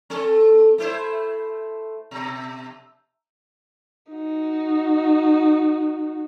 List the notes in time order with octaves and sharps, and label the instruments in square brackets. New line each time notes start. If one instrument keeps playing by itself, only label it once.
[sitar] C4 A4
A3 E4 C5
B2
[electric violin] D#4 F#4